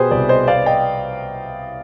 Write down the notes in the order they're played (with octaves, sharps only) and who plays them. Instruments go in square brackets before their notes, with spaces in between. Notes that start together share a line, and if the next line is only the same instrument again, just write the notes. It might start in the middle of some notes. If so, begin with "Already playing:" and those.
Already playing: [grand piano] B2 G4 G#4 B4 C5
C2 B4 D5
C5 D#5
B3 D5 F5
D#5 G5